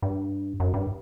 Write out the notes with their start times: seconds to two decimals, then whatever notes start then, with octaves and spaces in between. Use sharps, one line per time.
0.02 G2
0.60 F#2
0.74 G2